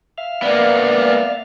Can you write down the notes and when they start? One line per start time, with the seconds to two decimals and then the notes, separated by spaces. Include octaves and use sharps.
0.18 E5 F5 F6
0.42 A#3 B3 D5